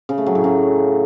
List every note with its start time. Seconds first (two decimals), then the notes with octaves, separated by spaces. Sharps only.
0.09 C#3
0.18 A3
0.26 F#3
0.35 A2
0.44 C#3